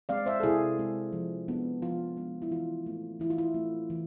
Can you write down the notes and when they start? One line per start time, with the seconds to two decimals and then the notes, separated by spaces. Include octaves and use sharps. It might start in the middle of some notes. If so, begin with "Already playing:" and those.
0.09 G#3 C4 D5 F5
0.26 C5 E5
0.40 A4
0.43 C3 E4 G#4
0.79 G#3 C4
1.12 F3
1.48 G#3 B3 D4
1.82 F3 F4
2.17 G#3 B3 D4
2.42 E4
2.51 E3 F4
2.86 A3 C4
3.20 E3 E4
3.30 F4
3.38 E4
3.54 A3 C4
3.90 E3